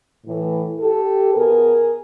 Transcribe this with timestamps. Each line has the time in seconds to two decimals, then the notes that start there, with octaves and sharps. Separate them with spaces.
0.25 A2 E3
0.80 G4 A4
1.35 B2 G#4 A#4